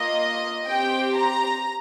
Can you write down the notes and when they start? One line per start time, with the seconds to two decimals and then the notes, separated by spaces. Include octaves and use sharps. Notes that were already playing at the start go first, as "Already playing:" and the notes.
Already playing: A#3 F4 D#5
0.68 C4 G4 G5
1.17 A#5